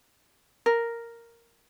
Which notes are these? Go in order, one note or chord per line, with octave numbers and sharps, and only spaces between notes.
A#4